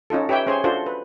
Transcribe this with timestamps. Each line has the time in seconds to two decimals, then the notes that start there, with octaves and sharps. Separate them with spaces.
0.10 C#4 D#4 F4 A4
0.29 G4 B4 C#5 E5 G5
0.46 C#4 G#4 C5 C#5 G#5
0.64 D4 F4 F#4 A4 C5
0.86 B4